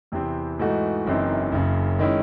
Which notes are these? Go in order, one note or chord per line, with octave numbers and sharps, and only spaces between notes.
E2 C3 E3 C4
G#2 E3 A3 D#4 F#4
F#1 F#2 E3 C4 D#4
F#1 F#2 C#3
D#3 G#3 C#4 E4